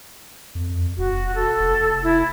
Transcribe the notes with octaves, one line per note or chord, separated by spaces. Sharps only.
F2
E1 F#4
A4
F1
E4